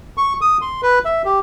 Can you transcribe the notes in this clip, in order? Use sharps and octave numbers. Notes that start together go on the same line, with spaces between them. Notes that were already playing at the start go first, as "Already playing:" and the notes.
C#6
D#6
C6
B4
E5
G4